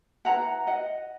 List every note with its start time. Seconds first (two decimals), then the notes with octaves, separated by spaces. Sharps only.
0.25 E4 B4 F#5 A#5
0.67 D#5 F#5